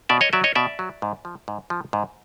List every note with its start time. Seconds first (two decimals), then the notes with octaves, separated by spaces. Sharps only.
0.09 B2 D5 E5
0.21 C#5 D#5
0.33 F#3 D5 E5
0.44 C#5 D#5
0.55 B2 D5 E5
0.79 F#3
1.02 G#2
1.25 F3
1.48 G#2
1.70 F3
1.93 G#2